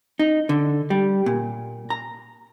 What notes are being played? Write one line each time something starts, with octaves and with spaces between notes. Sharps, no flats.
D#4
D3
G3
A#2
A#5